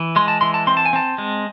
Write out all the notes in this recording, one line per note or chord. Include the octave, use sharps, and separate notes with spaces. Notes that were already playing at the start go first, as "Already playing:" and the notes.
Already playing: E3
G#3 C6
A5
E3 C6
A5
C4 C6
A5
G#5
C4 A5
G#3